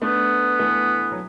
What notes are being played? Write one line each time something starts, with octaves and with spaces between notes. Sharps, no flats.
A3 B3 D4
E3 A3
F#3